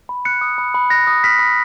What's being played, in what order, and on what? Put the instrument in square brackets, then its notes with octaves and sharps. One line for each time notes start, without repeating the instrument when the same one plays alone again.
[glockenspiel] B5
F#6 C#7
D#6
B5
B5
F#6 A#6
D#6
F6 B6
B5